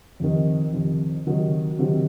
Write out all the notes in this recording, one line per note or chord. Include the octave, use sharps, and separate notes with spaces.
F2 C3 D#3
F2 C3 D#3
C3 D#3 F#3
C3 D#3 F#3